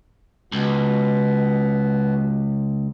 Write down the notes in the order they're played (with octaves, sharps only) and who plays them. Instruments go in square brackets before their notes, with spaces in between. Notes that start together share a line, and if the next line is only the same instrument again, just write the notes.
[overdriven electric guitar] C#2 [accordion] B2